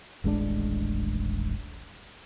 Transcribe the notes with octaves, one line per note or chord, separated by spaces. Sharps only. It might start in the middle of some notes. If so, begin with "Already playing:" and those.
D#1 A1 G#3 D4